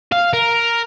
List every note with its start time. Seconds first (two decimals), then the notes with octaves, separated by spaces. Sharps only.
0.12 F5
0.33 A#4